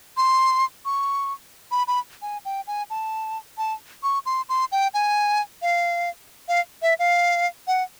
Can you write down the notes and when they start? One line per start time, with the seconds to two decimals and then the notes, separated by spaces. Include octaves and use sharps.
0.17 C6
0.85 C#6
1.71 B5
1.88 B5
2.22 G#5
2.45 G5
2.67 G#5
2.90 A5
3.58 A5
4.03 C#6
4.26 C6
4.49 C6
4.72 G5
4.94 G#5
5.62 F5
6.48 F5
6.82 E5
6.99 F5
7.67 F#5